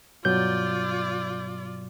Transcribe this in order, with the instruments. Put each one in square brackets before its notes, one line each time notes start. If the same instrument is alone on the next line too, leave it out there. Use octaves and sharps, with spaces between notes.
[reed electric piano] G2 B2 F#3 [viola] F4 D5 [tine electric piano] G6